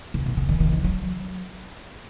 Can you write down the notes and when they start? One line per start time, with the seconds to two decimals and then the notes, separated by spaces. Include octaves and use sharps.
0.14 C#3
0.26 B2
0.37 C#3
0.49 D#3
0.60 D#3
0.73 E3
0.84 F#3